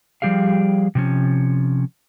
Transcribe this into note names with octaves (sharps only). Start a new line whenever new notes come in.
F3 G3 G4 G#4 F5
C3 F3 C#4